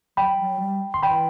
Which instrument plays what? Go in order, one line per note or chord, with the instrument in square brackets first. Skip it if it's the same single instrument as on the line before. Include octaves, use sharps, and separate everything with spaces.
[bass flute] F#3 [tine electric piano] G5 B5
[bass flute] F#3
G3
[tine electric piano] C6
[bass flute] E3 [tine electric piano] G5 B5